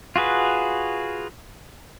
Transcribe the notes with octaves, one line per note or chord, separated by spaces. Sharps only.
F4 F#4 G#4 B4